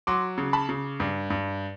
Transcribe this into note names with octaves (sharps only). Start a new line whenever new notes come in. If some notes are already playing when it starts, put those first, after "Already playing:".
F#3 C6 D6
C#3
A5 B5
C#3
G2
G2